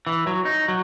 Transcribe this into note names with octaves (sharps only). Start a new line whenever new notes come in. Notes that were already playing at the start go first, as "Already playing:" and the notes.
E3
F#3
D#4
F#3